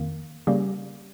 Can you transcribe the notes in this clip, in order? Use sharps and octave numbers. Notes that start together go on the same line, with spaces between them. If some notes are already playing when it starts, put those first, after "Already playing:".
Already playing: F2 D#3 A#3
C#3 G3 A#3 C#4 G4